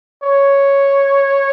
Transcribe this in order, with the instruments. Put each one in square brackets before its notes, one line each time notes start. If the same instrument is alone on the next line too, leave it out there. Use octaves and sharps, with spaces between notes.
[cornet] C#5